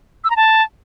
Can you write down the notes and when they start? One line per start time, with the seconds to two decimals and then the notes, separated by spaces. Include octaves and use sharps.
0.24 E6
0.30 A#5
0.36 A5